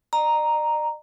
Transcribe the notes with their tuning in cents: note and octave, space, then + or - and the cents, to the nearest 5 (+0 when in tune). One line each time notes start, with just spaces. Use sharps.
D5 +45 A#5 +0